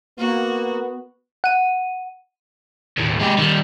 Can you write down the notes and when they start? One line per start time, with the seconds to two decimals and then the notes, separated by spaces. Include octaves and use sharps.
0.18 A#3 B3 F#4
1.44 F#5 D#7
2.98 D#2 A2
3.21 G#3 G4
3.38 D#3 G3